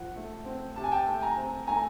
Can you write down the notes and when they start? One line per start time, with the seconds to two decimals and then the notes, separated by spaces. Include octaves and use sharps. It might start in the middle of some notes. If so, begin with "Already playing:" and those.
Already playing: F3 F#5
0.16 A3
0.45 C4
0.76 C3 A5
0.84 G#5
0.92 G5 A5
1.06 A3
1.21 G#5 A#5
1.37 C4
1.67 A3 G#5 A#5